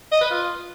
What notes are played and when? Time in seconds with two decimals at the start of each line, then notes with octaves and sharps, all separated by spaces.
0.12 D#5
0.21 B4
0.31 F4